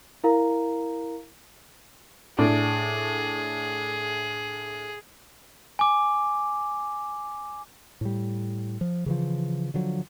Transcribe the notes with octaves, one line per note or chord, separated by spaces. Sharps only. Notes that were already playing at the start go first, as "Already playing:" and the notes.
E4 A#4 F5 A#5
A2 D4 G#4
G#5 D6
A2 G3
F3
C#3 E3 F3
D3 F3 F#3